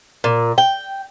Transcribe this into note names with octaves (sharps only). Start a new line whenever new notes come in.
A#2
G5